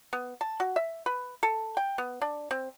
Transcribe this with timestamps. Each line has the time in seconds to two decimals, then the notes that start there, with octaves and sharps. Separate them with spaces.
0.13 B3
0.41 A5
0.60 F#4
0.76 E5
1.06 B4
1.43 A4
1.77 G5
1.98 B3
2.22 D4
2.51 C4